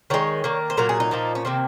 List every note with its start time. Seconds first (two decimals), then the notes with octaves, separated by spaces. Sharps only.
0.10 D#3 G#3 C#5
0.44 D#3 A#3
0.70 C5
0.77 A#2 F#3 A#3 A#4
0.89 G#4
1.00 D#4
1.11 A#2 F3 A#3
1.35 C#4
1.45 C3 D#3 A#3 C4